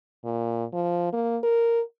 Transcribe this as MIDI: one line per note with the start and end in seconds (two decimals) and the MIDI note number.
0.24 0.64 46
0.73 1.08 53
1.13 1.37 58
1.43 1.81 70